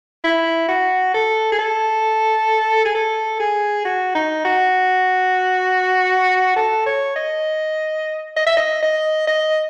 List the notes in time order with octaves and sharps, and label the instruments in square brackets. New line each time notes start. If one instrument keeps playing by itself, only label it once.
[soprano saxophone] E4
F#4
A4
G#4
A4
G#4
A4
G#4
F#4
D#4
F#4
A4
C#5
D#5
D#5
E5
D#5
D#5
D#5